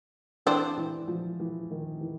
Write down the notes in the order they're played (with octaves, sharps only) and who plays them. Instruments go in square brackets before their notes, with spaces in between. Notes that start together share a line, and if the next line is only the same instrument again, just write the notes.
[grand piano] E3 [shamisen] C4 D4
[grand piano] E3
F3
E3
D#3
E3